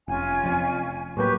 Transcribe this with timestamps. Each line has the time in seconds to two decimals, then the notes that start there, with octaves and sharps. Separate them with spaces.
0.08 F1 C#4 F4 G#5
0.44 F1 F2
1.17 A2 F#3 A#3 G4 B4 C#6